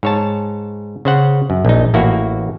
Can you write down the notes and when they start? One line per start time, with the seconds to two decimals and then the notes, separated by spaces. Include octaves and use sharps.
0.03 G#2 C#5 A5
1.05 C#3 C5 F#5
1.50 F#2
1.65 A#1 D#4
1.94 A1 A#3 E4 F#4